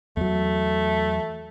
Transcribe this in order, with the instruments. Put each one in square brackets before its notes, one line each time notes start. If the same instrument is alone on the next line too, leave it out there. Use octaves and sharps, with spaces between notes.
[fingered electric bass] E2 F#3 [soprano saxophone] A3